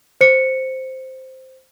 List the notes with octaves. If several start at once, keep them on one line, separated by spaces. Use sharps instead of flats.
C5 C#7